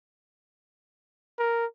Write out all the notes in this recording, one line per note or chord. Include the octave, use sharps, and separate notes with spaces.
A#4